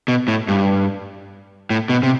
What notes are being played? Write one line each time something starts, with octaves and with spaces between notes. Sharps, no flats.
B2
A2
G2
A2
B2
C3